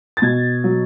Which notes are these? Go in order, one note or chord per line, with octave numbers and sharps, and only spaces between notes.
A6
B2 G#6
F#3